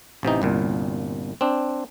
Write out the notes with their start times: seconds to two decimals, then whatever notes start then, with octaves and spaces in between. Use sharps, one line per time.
0.23 A1 C3 E3 D#4
0.42 G1 C2 A#2
1.41 C4 D4